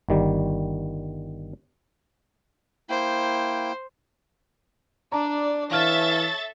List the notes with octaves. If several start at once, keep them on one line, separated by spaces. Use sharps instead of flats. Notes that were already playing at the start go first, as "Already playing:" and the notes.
G1 D#3 G3
A#3 E4 C5 G5
D4 D5 A5 A#5
E3 A4 C#5 E5 F5 A5 F6 A6